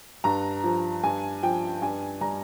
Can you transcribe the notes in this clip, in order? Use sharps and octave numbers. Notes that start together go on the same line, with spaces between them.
G2 A#5
F3
G2 G#5
F3 G5
G2 G#5
G3 A#5